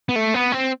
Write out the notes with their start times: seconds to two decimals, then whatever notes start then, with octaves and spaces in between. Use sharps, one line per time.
0.09 B3
0.16 A3
0.34 B3
0.52 C4